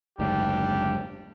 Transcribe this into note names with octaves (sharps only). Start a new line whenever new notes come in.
F#1 D2 G#2 G3 D4 G4